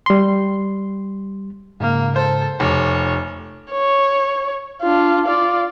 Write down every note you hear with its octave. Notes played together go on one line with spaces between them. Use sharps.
G3 C6
G#2 C#3 A#3
A4 C5
F1 C#5 G#5 D6
C#5
D4 F4
F4 D5